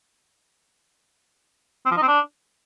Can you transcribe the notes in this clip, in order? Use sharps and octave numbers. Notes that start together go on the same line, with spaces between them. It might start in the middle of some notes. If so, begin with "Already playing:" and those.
C4
F3
D#4
C4
D4